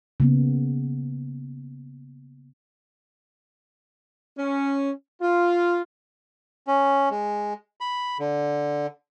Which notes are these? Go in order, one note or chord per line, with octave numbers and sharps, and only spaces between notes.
C#3 A#3 B3
C#4
F4
C#4
G#3
B5
D3